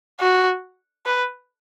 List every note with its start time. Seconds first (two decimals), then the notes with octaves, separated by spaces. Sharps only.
0.20 F#4
1.06 B4